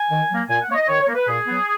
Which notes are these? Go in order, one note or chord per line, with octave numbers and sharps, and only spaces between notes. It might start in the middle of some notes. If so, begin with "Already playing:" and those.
Already playing: G#5
D#3
F#3 A#3
A#2 G#5
F#5
A#3 C#5
D#5
D#3 C#5
C#5
A#3
B4
A#2 G#4
F#3 B3